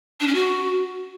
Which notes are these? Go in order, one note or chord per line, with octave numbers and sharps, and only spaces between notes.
D4
C#4
F#4